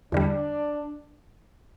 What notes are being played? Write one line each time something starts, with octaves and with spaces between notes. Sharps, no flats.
E2 D3 G3 D4